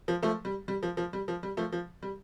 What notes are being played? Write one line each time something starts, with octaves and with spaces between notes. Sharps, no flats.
F3
F3 A3
G3
G3
F3
F3
G3
F3
G3
F3 A3
F3
G3